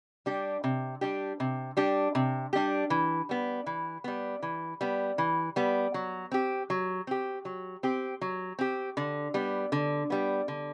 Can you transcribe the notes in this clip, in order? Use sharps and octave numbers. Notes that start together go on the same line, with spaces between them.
G3 D4 G4
C3
G3 D4 G4
C3
G3 D4 G4
C3
G3 D4 G4
E3
G3 B3
E3
G3 B3
E3
G3 B3
E3
G3 B3
F#3
C4 G4
F#3
C4 G4
F#3
C4 G4
F#3
C4 G4
D3
G3 B3
D3
G3 B3
D3